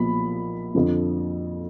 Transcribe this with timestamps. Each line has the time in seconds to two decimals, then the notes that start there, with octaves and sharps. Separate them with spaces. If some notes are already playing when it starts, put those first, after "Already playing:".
Already playing: B1 A#2 F3 B5
0.75 F2 D3 F3